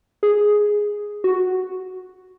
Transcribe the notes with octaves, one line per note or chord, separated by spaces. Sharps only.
G#4
F#4